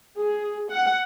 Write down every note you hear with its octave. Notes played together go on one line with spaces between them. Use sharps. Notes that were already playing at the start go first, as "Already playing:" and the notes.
G#4
F#5